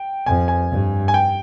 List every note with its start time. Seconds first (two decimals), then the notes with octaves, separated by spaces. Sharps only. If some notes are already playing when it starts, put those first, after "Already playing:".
Already playing: G5
0.26 F2 G#5
0.48 G#5
0.70 G2
1.08 G#5
1.14 G5